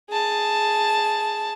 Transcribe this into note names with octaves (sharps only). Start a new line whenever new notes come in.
G#4 A5